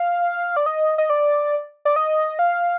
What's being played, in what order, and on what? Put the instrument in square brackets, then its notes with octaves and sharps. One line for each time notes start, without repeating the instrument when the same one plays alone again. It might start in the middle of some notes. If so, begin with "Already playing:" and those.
Already playing: [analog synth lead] F5
D5
D#5
D#5
D5
D5
D#5
F5